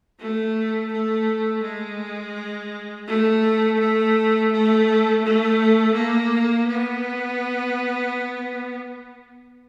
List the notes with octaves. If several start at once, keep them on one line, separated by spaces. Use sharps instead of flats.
A3
A3
G#3
A3
A3
A3
A3
A#3
B3